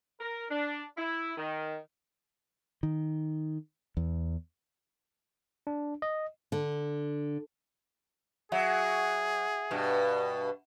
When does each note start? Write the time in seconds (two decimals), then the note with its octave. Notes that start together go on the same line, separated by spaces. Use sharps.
0.20 A#4
0.50 D4
0.97 E4
1.37 D#3
2.83 D#3
3.97 E2
5.67 D4
6.02 D#5
6.52 D3
8.52 F#3 G#4 E5 F#5
9.71 G2 B2